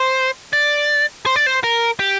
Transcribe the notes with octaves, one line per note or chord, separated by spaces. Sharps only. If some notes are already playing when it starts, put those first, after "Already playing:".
Already playing: C5
D5
C5
D5
C5
A#4
G4